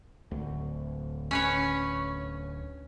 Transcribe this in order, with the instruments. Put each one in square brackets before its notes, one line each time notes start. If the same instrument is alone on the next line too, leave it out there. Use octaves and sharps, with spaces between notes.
[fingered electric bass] D1 D2
[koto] C#4 B4 C#5